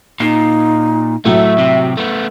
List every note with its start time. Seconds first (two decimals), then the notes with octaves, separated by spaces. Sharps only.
0.20 A#2 D#4 C7
1.25 A2 F#3 A3 F#4 E5
1.58 C3
1.97 A3 B3